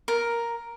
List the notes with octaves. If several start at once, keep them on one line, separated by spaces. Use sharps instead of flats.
A#4